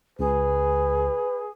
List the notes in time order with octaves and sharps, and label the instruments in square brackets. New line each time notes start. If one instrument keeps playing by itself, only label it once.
[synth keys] C#2 [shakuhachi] G#4 [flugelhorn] B4